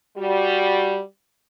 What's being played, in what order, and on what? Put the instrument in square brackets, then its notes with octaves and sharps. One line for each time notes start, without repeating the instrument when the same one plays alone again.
[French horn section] G3 F#4